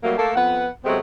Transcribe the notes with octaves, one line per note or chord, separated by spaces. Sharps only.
F#3 G3 A3 A#3
A3 A#3 A4
F2 B3 B4 F#5
C3 F#3 G#3 A3 B3 C4